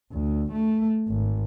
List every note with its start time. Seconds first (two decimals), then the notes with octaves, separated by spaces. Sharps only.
0.12 D2
0.53 A3
1.08 G#1